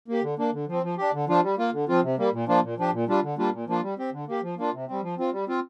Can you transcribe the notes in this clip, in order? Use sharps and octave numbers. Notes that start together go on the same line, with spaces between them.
A#3 G4
D3
A#3 D4
D3
F3 C4
F3
D4 G4
D3
F3 D4 F4
G3
A#3 F4
D3
F3 C4 F4
C3
G3 A#3
A#2
F3 A#3 D4 F4
A#2
F3 D4 G4
A#2
G3 D4 F4
D3
G3 A#3 D4 F4
A#2
F3 A#3 D4 F4
G3
C4 G4
D3
A#3 G4
F3
A#3 D4 F4
C3
G3 C4
F3
C4 F4
G3
C4 F4